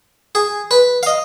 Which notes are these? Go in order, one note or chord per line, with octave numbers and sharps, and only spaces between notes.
G#4
B4
F5
D#5